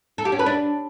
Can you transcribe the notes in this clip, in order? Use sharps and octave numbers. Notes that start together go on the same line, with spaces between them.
A4
G4
C#4
B4
D4